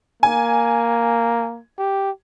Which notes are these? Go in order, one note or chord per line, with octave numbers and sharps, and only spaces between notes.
A#3 G#5
G4